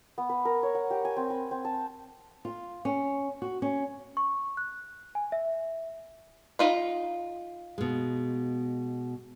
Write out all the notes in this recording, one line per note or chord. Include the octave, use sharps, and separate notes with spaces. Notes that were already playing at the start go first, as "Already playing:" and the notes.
B3
B4
A#4
C#5
F#5
G4
G#5
C4
B5
C4
A5
F4
C#4
F#4
C#4
C#6
F#6
G#5
E5
D#4 F4 B5
B2 G#3